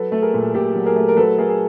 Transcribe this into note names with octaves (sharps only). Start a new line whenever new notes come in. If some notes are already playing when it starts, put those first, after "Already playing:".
Already playing: F#3 A4 B4
A3 A4
G#4 A#4
A#2
A#2 G4 A4
F#3
G#4 A#4
A3
A#4
F#3 A4 B4
A3 G#4 A#4
G#4